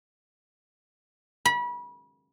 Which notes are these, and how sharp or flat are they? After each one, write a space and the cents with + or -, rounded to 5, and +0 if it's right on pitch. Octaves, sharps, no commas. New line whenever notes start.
B5 -30